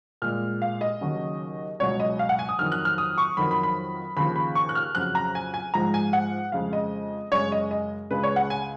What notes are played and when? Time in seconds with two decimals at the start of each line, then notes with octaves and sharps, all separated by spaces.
0.22 A#2 G#3 F6
0.62 F5
0.81 D#5
1.01 D#2 C#3 F#3
1.79 C#2 B2 F#3 C#5
2.00 D#5
2.19 F5
2.29 F#5
2.39 G#5
2.49 D#6
2.59 F2 D#3 F#3 F6
2.72 F#6
2.85 F6
2.98 D#6
3.18 C#6
3.37 F2 D#3 F#3 B5
3.51 B5
3.63 B5
4.17 D#2 C#3 F3 B5
4.36 B5
4.55 C#6
4.69 F#6
4.75 F6
4.95 F2 C#3 F#3 F#6
5.15 A#5
5.35 G#5
5.54 G#5
5.74 G#2 F3 G#3 A#5
5.94 G#5
6.13 F#5
6.52 F2 C#3 G#3 F5
6.73 D#5
7.31 F#2 C#3 G#3 C#5
7.52 D#5
7.71 D#5
8.11 C#2 C#3 G#3 B4
8.23 C#5
8.36 F#5
8.50 G#5